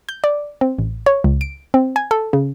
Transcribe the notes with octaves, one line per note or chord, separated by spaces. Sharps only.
G6
D5
C4
A1
C#5
C#2
D7
C4
G#5
A4
C#3